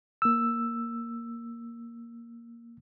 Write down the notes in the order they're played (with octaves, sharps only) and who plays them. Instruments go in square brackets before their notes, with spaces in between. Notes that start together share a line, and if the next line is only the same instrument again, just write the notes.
[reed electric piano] A#3 E6